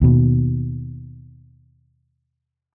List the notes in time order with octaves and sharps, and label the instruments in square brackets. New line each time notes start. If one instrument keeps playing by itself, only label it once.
[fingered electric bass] D#2 B2